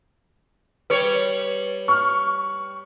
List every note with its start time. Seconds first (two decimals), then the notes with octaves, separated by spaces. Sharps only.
0.90 G3 B4 C#5
1.88 C#6 F6